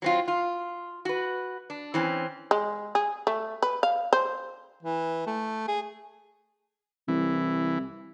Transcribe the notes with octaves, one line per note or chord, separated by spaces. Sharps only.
F#3 C4 F4
F4
F#4 B4
D4
E3 C4 C#4
G#3
G#4
A3
B4
F5
C5
E3
A3
G#4
C2 E3